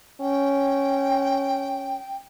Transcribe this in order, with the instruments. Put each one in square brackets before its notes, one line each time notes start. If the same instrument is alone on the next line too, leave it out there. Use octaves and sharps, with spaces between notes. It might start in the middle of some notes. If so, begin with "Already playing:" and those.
[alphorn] C#4 [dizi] G5